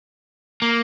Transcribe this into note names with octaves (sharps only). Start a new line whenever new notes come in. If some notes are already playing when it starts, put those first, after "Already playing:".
A#3